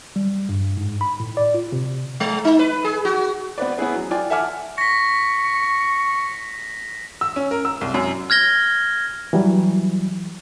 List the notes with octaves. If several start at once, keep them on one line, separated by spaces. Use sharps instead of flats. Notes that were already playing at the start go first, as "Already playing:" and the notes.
G3
G2
G#2
B5
A2
D5
F4
C3
G#3
D#4
B4
G#4
F#4
B3 C4 B4 D5
B3 C#4 E4 G#4 B4
F#3
F4 D5 G5 G#5
A4 E5 F#5 G#5 D6 F6
C#6 A#6 B6
E6
C#4
A#4
E6
C2
F#2
F6 G#6 A#6 G7
E3 F#3 G3